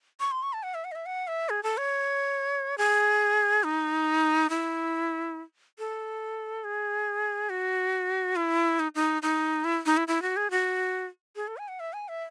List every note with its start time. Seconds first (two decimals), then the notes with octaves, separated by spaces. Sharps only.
0.20 C#6
0.31 C6
0.43 C#6
0.53 A5
0.63 F#5
0.74 E5
0.84 F#5
0.92 D#5
0.95 E5
1.06 F#5
1.28 E5
1.49 G#4
1.63 A4
1.78 C#5
2.78 G#4
3.64 D#4
4.50 E4
5.79 A4
6.64 G#4
7.50 F#4
8.36 E4
8.79 D#4
8.95 D#4
9.22 D#4
9.64 E4
9.86 D#4
9.97 E4
10.08 E4
10.22 F#4
10.37 G#4
10.51 F#4
11.36 G#4
11.48 A4
11.58 G#5
11.68 F#5
11.80 E5
11.93 G#5
12.08 E5